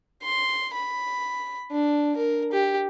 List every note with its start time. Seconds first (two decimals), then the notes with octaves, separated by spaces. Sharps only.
0.24 C6
0.74 B5
1.71 D4
2.17 A#4
2.52 G4